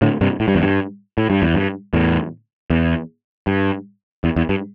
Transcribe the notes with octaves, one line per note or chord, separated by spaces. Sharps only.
A2 D3
G2 C3
A2
G2
E2
G2
A2
G2
E2
G2
E2 A2
E2
G2
E2
E2
G2